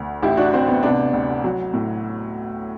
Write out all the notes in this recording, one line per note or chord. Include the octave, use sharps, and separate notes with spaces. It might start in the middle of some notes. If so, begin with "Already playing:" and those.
Already playing: D2
A1 E4 G4
D4 F#4
A1 C4
B3
C3 B3 D4
D2
F#3
A2